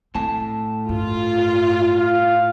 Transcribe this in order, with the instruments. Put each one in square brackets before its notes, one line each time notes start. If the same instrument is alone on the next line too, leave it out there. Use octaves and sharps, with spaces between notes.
[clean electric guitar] A2 A5 [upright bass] C4
[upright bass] G2 [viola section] F4
[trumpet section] F5